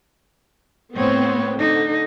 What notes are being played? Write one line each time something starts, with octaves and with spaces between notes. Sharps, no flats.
A2 B3 C4 C#5
D3 D#4